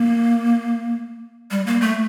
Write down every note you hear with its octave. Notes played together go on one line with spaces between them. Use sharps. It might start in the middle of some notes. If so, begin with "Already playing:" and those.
Already playing: A#3
G3
A#3
A3